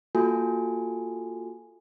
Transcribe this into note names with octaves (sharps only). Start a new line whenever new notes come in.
A#3 F4 F#4 A4 G#5